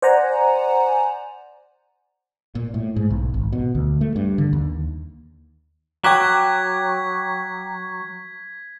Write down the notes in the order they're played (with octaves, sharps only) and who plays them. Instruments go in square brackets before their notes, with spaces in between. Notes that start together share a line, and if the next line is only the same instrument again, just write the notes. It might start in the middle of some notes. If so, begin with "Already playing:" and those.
[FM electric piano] C5 D5 F#5 G#5 A#5
[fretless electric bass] A#2
A2
G#2
B1
G#1
B2
D2
A3
G2
D3
D#2
[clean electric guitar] F#3 [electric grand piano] G5 D6 F#6 [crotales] G#6 B6